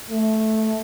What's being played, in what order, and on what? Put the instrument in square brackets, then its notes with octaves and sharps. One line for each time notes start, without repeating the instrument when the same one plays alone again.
[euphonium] A3